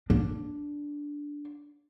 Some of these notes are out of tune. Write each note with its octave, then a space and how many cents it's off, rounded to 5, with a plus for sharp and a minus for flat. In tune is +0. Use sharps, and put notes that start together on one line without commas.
D4 -5